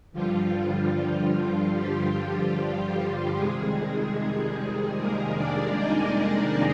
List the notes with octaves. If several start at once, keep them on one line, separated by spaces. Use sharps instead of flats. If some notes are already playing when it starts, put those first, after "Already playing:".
G2 D3 F3 G3 F4
F3 F4
G3 G4
F2 C3 D#3 G3 G#3 G#4
A#3 A#4
D4 D5
D#4 D#5